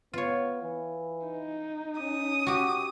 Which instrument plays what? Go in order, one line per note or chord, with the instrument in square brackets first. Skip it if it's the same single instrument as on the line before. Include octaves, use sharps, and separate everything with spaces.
[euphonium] B3 [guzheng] F4 C#5
[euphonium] E3
[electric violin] D#4
[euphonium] C#4 [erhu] D#6
[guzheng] F#4 G4